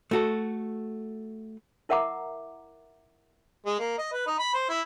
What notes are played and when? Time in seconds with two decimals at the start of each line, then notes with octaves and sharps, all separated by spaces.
0.11 A3 F#4 A4
1.89 E4 A#4 E5 F#5 A#5 D6
3.66 G#3
3.80 A#3
3.98 D#5
4.13 B4
4.27 D#4
4.39 B5
4.54 C5
4.69 E4